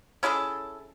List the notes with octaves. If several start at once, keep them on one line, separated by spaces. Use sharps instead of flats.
C#4 E4 G#4 A4